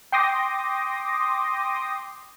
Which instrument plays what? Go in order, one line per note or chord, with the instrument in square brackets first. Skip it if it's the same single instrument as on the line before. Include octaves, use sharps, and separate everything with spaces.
[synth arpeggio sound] G5 C6 D6 D#6 A#6